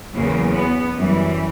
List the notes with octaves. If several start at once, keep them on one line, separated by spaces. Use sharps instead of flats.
E2 C#3 F#3 A#3
B3
F#2 E3 G3